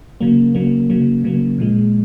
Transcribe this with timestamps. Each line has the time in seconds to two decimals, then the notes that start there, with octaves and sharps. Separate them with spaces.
0.21 C#3 F#3 A#3
0.55 C#3 F#3 A#3
0.90 C#3 F#3 A#3
1.24 C#3 F#3 A#3
1.58 A#2 F3 G#3